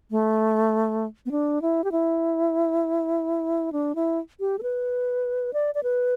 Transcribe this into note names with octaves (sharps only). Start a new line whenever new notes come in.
A3
B3
D4
E4
G4
E4
D4
E4
G4
A4
B4
D5
D5
B4